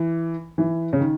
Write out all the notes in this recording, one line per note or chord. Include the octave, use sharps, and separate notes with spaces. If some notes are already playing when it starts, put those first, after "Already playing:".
Already playing: E3
E3
C#3
D#3